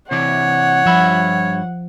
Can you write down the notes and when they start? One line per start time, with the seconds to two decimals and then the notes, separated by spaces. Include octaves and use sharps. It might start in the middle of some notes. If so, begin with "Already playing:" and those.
0.11 C3 E3 C#5 D5 F#5
0.86 G2 F3 E5 B5